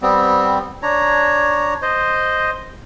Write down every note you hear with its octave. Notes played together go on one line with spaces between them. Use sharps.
G3 B3 C4
D4 C#5 A#5
C5 D#5